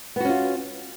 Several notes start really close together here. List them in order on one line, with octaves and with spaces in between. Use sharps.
B3 F#4 C#4 F4